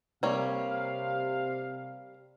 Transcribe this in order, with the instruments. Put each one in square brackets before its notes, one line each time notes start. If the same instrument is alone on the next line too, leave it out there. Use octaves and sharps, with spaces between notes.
[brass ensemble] C3 F5 [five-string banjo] G3 A#3 C#5